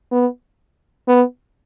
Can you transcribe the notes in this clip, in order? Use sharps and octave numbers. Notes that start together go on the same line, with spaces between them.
B3
B3